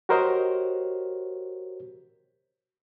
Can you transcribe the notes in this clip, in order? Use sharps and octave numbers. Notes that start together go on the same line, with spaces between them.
F#4 G4 A#4 C5 C#5 D#5